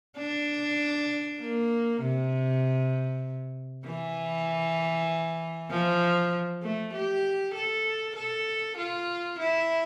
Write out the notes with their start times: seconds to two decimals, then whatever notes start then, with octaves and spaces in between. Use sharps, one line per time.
0.18 D4
1.40 A#3
2.02 C3
3.86 E3
5.71 F3
6.62 A3
6.93 G4
7.54 A4
8.16 A4
8.77 F4
9.39 E4